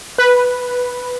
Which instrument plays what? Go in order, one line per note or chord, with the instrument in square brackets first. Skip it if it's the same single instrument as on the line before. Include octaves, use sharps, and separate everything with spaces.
[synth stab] B4